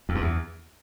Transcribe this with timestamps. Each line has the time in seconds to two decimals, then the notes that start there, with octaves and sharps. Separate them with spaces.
0.09 F2
0.15 G2
0.21 E2